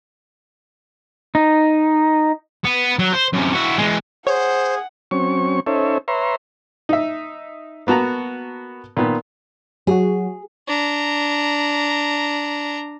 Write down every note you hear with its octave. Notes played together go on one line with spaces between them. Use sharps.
D#4
B3
F#3
C5
F#2 C3
E4 F#4
E3 G#3
G#4 C5 C#5 F#5
F#3 C4 C#4 C#6
C#4 D#4 A4 C5 C#5 E5
B4 C#5 E5 A#5 C6
D#4 E5
A#3 B3 F#4 A5 A#5
A#2 D#3 B3
F#3 F#4 G#4
D4 A#5